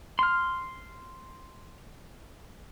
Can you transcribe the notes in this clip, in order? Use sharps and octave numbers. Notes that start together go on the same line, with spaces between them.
C6 F6